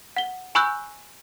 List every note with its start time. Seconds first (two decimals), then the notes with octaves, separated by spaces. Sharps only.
0.16 F#5 G7
0.55 G#5 B5 C#6 E6 F#6 G6